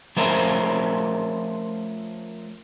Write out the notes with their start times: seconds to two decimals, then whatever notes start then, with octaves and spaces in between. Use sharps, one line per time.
0.17 F3 A3 C#4 A#4 C5 E5